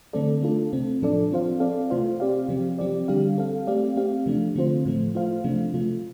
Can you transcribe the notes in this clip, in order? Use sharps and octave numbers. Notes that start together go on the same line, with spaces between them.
D3 A3 C4 A4 D5
A3 D4 F4 A4
C3 A3 C4
A2 F3 D4 A4 D5
F3 C4 F4 C5 F5
C4 A4 D5 F5
C3 A3 F4 C5 F5
C4 G4 D5 F5
C3 F3 C4 G4
F3 C4 G4 D5
D3 G3 D4 G4 F5
C4 A4 F5
A3 C4 G4 D5 F5
A3 C4 G4 F5
C3 F3 A3 D4
D3 A3 C4 F4 C5
A2 F3 A3
A3 F4 C5 F5
C3 F3 A3 D4
C3 A3 F4